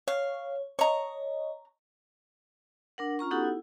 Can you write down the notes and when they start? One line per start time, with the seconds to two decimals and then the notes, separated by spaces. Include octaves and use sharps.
0.08 C#5 F5
0.79 C#5 D#5 A#5 C#6
2.98 D4 A#4 F#5
3.19 C#4 F4 A#5 C#6
3.31 B3 D#4 F#4 G4 A4 F#5
3.44 E4